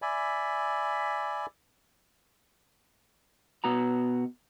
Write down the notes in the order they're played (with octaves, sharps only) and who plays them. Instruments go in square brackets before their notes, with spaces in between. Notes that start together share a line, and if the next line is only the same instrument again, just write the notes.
[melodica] D5 E5 G#5 B5
[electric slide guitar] B2 B3 F#4 A#5